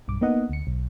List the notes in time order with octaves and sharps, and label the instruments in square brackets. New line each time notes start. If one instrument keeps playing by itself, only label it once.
[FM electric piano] B1 G2 D6
A#3 B3 D#4 D#5 F#5
D2 C#7
B1